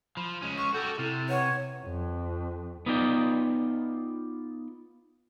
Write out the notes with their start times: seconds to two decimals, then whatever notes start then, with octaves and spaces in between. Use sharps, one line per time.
0.17 F3 B5
0.42 G#3 C#4
0.58 C#6
0.74 F#4 G4 A4 G6
0.99 C3 E4 F6 A6
1.29 B4 C#5 F#5
1.85 F2
2.86 B3 D#4 F4 D5 G5